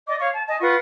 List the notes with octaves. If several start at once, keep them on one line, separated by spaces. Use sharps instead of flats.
D5 D#5 D6
C#5 F5 C#6
A5
D#5 G#5 A5
F4 B4 F#5 C#6